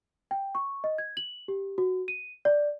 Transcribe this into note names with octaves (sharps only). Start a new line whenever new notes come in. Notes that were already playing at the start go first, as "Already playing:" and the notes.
G5
C#6
D#5
G#6
F#7
G4
F#4
D#7
D5